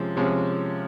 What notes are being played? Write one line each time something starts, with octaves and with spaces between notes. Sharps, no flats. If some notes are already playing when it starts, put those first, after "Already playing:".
Already playing: C3 F3 G#3 C#4
C3 F3 G#3 C#4